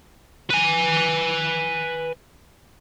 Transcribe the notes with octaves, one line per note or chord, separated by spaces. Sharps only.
B4 G#5